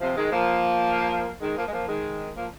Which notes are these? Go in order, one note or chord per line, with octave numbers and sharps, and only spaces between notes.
C3 F3
D#3 G#3
F3 A#3
D#3 G#3
F3 A#3
G#3
F3 A#3
D#3 G#3
F3 A#3